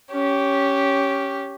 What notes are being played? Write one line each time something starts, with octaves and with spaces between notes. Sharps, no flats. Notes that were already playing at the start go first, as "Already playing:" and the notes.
C#4 G4